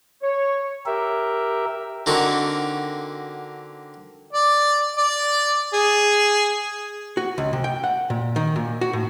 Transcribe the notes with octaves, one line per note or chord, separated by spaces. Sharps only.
C#5
G4 A#4 E5
D3 A#3 C4 D#4 F#4 A#4
D5
D5
G#4
F#4
C#2
C3
G5
F#5
A#2
D#3
A#2
F#4
A2